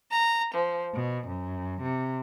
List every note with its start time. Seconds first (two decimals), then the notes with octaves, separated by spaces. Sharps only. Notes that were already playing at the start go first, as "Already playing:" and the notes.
0.10 A#5
0.54 F3
0.93 B2
1.28 F#2
1.81 C3